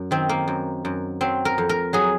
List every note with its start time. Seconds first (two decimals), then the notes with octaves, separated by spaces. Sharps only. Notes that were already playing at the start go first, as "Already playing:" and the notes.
Already playing: F#2
0.11 D#3 C4
0.29 A#3
0.48 F#2
0.85 F#2
1.21 F#3 C4
1.45 A#4
1.58 F2
1.69 A#4
1.93 F#3 G#4